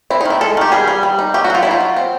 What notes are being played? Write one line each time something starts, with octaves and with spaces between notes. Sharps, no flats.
C4 E4
D#4
D#3 E4
G#3 A4
D#3 G4
G3 G#4
G3
G3
D#4
F#3 G4
F#4
F#3 F4
D#4 E4
F4
F#3
C4